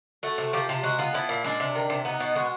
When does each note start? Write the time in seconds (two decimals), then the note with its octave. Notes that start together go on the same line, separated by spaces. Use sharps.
0.23 A3 F#4
0.38 C3
0.53 F3 G4
0.69 C3 G4
0.83 G#3 F#4
0.99 B3 F4
1.14 F3 E4
1.29 A#2
1.44 G#3 D4
1.60 C3
1.75 D#3
1.90 C3
2.05 B3 D#4
2.20 B2
2.35 G#3 F#4